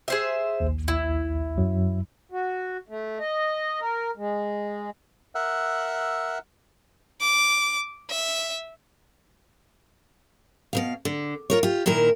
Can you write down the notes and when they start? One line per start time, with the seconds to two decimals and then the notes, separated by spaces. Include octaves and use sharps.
0.08 G#4 C5 E5
0.60 A#1 D#2
0.88 E4
1.58 F#2 F#3
2.32 F#4
2.89 A3
3.19 D#5
3.81 A#4
4.17 G#3
5.35 A#4 E5 F#5 E6 F#6
7.21 D6
8.10 E5
10.73 B2 D#3 F5
11.05 D3
11.50 F4 A#4 C#5
11.63 F4 G4
11.86 A#2 D#3 E4 A#4